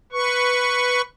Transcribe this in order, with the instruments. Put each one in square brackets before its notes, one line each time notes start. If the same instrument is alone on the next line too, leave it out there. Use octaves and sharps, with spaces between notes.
[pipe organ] B4 C#6